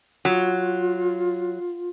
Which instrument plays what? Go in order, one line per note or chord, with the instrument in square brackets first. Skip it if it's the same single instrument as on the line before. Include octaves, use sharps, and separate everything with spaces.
[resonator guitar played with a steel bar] F#3 [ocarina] F4